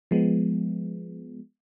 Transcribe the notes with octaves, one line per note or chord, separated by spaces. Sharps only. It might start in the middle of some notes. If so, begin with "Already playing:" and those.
F3 G#3 B3